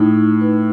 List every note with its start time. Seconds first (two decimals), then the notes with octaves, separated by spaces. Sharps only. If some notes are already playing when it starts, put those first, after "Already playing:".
Already playing: A2 D#4
0.15 D#4
0.41 B4